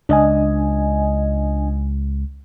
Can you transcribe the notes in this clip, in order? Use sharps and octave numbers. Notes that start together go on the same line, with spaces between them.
C#2 D4 D#5 G#5